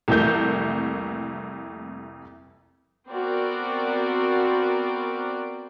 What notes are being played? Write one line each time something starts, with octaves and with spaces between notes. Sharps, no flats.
C2 F2 E3 A3 A#3 G6
B3 C4 F#4 A#4 D5